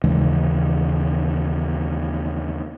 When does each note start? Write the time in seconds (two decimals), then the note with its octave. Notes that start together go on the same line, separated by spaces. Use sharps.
0.04 D#2 C#3 E3 G#3